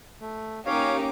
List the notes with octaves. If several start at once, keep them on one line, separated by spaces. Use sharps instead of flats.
A3
A#3 C#4 D#4 G4 C#5 F5 D6